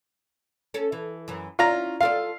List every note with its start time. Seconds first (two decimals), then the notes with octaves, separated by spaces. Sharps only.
0.74 C#4 A4
0.92 E3
1.28 F#2 E3
1.59 C#4 E4 F4 D5 A#5
2.01 F4 A4 D5 F5